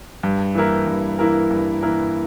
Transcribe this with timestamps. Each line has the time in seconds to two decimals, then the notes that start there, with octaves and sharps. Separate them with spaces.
0.23 G2
0.55 E3 A#3 E4 A#4
0.87 G2
1.19 E3 A#3 E4 A#4
1.51 G2
1.83 E3 A#3 E4 A#4